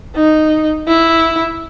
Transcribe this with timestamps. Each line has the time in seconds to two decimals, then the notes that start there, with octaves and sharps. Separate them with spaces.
0.15 D#4
0.87 E4